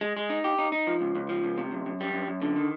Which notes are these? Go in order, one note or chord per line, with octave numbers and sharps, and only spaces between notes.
G#3
G#3
D#4
G4
D#4
D#4
F3
C#2
C#2
F3
C#2
C3
F#2
F#2
G3
F#2
F#2
D3
D#3